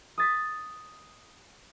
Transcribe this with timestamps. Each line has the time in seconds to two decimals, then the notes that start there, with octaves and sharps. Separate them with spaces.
0.18 D#6 A6 B6